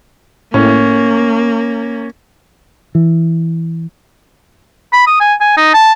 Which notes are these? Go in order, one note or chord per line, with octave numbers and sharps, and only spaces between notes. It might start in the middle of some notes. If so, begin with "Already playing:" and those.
A2 A#3 C#4
E3
B5
D#6
G#5
G#5
D#4
A5